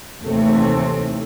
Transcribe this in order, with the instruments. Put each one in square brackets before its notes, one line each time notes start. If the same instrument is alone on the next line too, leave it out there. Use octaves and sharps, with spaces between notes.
[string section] D#2 A2 C3 E3 A3 C4